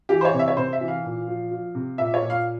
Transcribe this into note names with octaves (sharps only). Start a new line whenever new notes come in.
E3 G4
C5
C#5
C3
E5
C#5
C3 C5
E5
E3
F5
A#2
F3
F3
C3
A#2 E5
C#5
A#2
F5